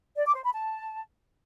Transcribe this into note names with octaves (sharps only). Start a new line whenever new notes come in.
D5
D6
C5
B5
A5